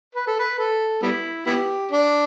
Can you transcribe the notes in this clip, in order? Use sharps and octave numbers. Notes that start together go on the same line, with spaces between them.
B4
A4
B4
A4
G3 B3 E4
B3 E4 G4
D4